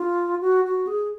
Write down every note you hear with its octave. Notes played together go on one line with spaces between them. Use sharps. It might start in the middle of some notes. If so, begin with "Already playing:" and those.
Already playing: F4
F#4
F#4
G#4